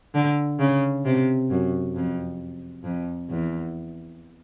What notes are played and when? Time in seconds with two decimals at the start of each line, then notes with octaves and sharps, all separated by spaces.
0.14 D3
0.59 C#3
1.05 C3
1.50 F#2
1.95 F2
2.84 F2
3.29 E2